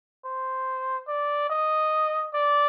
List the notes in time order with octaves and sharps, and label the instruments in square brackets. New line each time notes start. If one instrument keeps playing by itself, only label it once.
[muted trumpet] C5
D5
D#5
D5